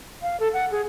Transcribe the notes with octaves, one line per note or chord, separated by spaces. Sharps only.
F5
A4
F#5
G#4